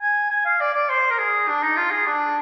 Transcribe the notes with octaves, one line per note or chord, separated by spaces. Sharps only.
G#5
G#5
F5
D5
D5
C5
A#4
G#4
D4
D#4
F4
G#4
D4